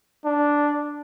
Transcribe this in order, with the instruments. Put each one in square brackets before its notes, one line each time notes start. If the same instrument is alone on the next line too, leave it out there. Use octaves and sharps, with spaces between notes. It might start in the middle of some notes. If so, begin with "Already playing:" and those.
[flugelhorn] D4